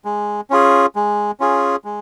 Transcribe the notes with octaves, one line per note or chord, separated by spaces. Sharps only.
G#3
C#4 F4 G#4
G#3
C#4 F4 G#4
G#3